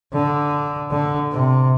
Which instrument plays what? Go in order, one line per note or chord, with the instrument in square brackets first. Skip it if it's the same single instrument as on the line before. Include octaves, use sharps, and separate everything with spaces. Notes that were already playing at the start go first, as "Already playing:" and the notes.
[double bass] D3
D3
C3